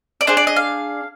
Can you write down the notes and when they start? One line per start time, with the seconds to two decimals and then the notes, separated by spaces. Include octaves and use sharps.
0.21 D5
0.27 D4 G#4 C5
0.37 D5
0.47 D#5
0.56 F5